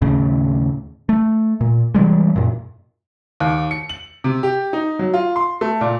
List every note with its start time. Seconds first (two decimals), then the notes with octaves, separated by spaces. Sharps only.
0.02 D#2 A2 C#3
1.09 A3
1.61 A#2
1.94 C3 E3 G3 G#3
2.36 F#2 A#2
3.40 D#2
3.71 C#7
3.89 F#7
4.24 C3
4.43 G4
4.73 D#4
4.99 F#3
5.14 F4
5.36 C6
5.61 A3
5.81 A#2